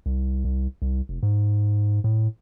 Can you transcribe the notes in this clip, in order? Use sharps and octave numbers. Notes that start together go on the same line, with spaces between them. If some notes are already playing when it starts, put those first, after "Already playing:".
C2
C2
C2
F1
G#2
A2